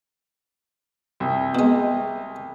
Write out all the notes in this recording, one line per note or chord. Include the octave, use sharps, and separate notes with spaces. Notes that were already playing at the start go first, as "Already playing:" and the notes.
C2
B2 G#3